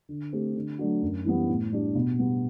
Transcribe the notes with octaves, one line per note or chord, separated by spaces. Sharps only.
D3
A3 C4 G4
D3
F#3 A3 D4 F#4
F#2
E3 G3 B3
A2
G3 D4 G4
B2
G3 B3